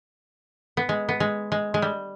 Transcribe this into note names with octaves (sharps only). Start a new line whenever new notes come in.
B3
G#3
B3
G#3
G#3
G#3
G3